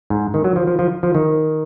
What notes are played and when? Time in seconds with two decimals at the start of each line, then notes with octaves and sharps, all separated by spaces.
0.10 G#2
0.34 D#3
0.44 F#3
0.56 F3
0.67 F3
0.79 F3
1.03 F3
1.15 D#3